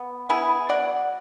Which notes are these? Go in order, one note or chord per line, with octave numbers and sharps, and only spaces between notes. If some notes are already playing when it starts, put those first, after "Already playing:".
Already playing: B3
B3 E4 G#4
F#3 D5 F#5